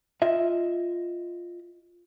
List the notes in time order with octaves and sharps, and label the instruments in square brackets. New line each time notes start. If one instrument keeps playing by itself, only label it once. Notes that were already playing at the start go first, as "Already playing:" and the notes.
[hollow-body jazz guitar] F4 D#5 E5